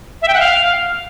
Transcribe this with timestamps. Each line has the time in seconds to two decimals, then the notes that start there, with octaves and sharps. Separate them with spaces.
0.22 E5
0.28 G5
0.34 F#5
0.40 F5